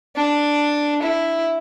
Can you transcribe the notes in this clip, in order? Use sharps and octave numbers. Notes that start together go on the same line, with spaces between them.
D4
E4